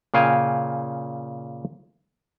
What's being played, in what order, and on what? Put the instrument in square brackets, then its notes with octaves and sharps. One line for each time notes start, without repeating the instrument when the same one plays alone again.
[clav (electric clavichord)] A#2 C#3 F5 G5 G#5